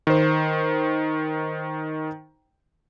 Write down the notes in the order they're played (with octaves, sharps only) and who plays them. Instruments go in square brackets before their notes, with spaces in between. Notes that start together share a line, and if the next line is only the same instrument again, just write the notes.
[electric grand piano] D#3 C5